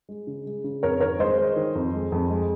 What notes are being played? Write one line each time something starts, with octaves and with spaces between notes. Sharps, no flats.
G#3
C#3
G#3
C#3
F2 A#4 C#5
D#3 A#4 C#5
G#3 C5 D#5
G#3
D#3
F2
G#3
F2
G#3